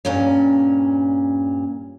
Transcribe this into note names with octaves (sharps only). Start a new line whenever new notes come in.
G2 A#2 C#4